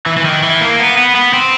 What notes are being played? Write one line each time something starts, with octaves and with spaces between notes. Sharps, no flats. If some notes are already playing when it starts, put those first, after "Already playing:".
E3
E3
D#3
E3
A#3
B3
B3
B3
C4